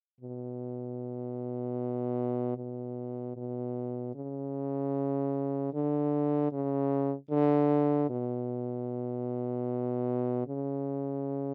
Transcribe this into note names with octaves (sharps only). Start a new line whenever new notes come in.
B2
B2
B2
C#3
D3
C#3
D3
B2
C#3